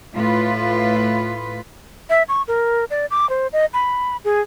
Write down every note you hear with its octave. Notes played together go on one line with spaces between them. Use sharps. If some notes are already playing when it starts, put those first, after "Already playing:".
A2 F4 B4
E5
C#6
A#4
D5
D6
C5
D#5
B5
G#4